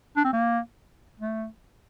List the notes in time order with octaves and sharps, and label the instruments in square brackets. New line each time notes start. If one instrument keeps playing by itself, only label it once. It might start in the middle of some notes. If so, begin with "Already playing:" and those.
[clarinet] D4
C4
A#3
A3